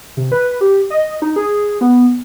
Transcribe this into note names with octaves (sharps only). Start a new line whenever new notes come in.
C3
B4
G4
D#5
D#4
G#4
B3